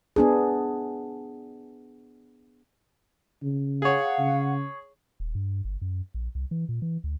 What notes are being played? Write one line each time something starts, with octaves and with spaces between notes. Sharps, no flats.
B3 D4 G#4
C#3
G#4 C#5 F5 F#5
C#3
D#1
G2
G1
F#2
A#1
C2
E3
A#2
E3
D2